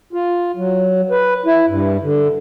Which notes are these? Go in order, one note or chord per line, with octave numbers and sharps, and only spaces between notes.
F4
F#3
B4
E4
G2
D3